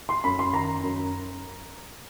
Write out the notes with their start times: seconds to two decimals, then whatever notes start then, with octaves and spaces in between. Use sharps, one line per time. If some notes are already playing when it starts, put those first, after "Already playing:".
0.09 C6
0.24 F#2 B5
0.39 C6
0.53 D#3 A#5
0.83 F#2